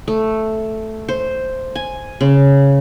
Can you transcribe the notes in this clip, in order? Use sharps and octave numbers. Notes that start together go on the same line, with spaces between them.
A3
C5
G#5
C#3